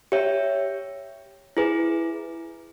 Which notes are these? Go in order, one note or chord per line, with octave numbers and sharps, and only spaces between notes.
G4 C#5 E5
E4 G#4 B4